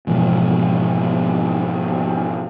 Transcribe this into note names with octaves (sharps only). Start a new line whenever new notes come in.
G#2 B2 E3 F3